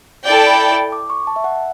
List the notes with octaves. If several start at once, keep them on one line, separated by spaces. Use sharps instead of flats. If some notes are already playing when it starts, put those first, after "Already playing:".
E4 A4 D5 G5
B5
D6
C#6
A5
E5
F#5